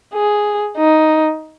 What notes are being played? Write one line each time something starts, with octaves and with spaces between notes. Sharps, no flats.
G#4
D#4